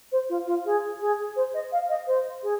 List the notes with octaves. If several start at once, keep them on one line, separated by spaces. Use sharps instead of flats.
C5
F4
F4
G#4
G#4
C5
D#5
F5
D#5
C5
G#4